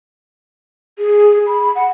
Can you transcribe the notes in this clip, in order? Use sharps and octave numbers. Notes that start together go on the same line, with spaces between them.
G#4
B5
F#5